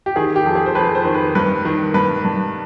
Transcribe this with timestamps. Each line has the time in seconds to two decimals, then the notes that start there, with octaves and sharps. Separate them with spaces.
0.06 G4
0.16 D#3 G#4
0.36 G4
0.46 F2
0.55 G#4
0.66 C5
0.75 F2 B4
0.95 C5
1.05 D#3
1.15 B4
1.35 G2 B4
1.65 D#3
1.94 G2 B4
2.25 G2